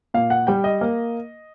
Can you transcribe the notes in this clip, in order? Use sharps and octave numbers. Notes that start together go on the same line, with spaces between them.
A#2 F5
F#5
G3 G5
D#5
A#3